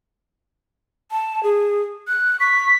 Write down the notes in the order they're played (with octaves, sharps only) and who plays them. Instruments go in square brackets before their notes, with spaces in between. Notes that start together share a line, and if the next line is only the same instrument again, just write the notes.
[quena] A5
G#4
F#6
[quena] C#6 [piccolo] B6